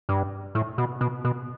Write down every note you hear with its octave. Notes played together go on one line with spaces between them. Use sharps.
G2
A2
B2
B2
B2